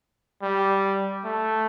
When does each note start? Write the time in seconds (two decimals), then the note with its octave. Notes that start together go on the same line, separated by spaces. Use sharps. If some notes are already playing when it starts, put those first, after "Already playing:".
0.42 G3
1.24 A3